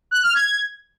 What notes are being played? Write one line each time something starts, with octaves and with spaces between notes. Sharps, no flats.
F#6
F6
G#6